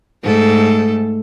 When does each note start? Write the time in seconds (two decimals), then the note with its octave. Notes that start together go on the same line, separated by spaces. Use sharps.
0.24 G#2 A3 A4